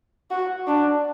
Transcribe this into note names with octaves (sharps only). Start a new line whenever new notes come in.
F#4
D4